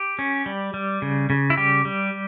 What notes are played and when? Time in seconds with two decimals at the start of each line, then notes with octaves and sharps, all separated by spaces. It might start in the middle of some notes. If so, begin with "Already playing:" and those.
Already playing: G4
0.19 C#4
0.46 G3
0.74 G3
1.02 C#3
1.30 C#3
1.50 E4
1.57 G3 G4
1.85 G3